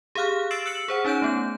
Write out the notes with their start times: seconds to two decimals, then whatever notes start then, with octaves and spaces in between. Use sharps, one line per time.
0.15 G4 G#4 F5 F6 F#6
0.51 E6 A6 C7 D7 E7 F#7
0.66 E6 F#6 C#7 F#7
0.88 G#4 C5 F#5
1.05 C#4 D#4 C#5 G6 D7
1.22 A3 B3 G6